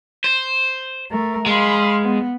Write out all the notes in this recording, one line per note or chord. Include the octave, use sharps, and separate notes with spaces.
C5
A3 A#4
G#3 F5 B5 C6
B3